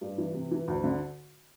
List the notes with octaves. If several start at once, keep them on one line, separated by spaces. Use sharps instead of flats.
G2
E3
C3
E3
D2
D3